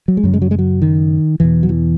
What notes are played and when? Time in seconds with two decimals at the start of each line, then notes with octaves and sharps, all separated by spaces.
0.08 F#3
0.17 G#3
0.23 F#2 C#3 F#3
0.33 G#3
0.42 F#3
0.51 G#3
0.59 F#3
0.82 D#3
1.40 E2 B2 E3
1.63 F#3
1.69 E3